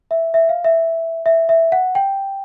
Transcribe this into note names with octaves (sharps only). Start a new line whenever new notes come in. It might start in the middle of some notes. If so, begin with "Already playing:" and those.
E5
E5
F5
E5
E5
E5
F#5
G5